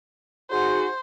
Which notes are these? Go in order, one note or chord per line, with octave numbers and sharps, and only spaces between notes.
D#4 F#4 G#4 C5